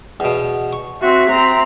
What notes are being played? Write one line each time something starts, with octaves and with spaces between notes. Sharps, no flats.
E2 B2
C#6
C4 F#4 E5
C4 A#5